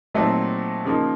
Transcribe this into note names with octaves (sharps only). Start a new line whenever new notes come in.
A#2 F#3 A3 C4 D#4
C#3 F3 A#3 D#4